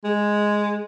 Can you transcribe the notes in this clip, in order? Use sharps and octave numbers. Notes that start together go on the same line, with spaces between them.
G#3